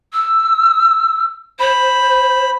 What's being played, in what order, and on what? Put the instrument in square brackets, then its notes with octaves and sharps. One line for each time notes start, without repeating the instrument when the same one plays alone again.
[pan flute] E6
[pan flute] C5 [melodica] B5